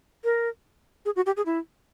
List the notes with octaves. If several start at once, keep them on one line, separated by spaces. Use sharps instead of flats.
A#4
G#4
F#4
G4
G#4
E4